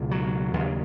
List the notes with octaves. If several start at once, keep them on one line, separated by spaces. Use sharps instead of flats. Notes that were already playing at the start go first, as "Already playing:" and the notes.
Already playing: C#2 B2
F#3
D#2 C#3